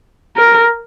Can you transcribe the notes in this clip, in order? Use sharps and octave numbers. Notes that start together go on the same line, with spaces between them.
A#4